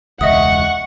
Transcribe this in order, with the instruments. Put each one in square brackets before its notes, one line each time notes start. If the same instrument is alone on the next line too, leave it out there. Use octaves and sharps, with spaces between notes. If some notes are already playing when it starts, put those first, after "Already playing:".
[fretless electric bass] E1 C#2 [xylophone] D#5 E5 D#6 [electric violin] F#5 C#6